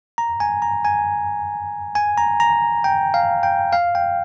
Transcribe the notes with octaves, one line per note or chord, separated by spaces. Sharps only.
A#5
G#5
A#5
G#5
G#5
A#5
A#5
G5
F5
G5
F5
G5